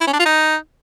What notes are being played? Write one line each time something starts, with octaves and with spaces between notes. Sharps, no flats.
E4
C#4
D4
F4
D#4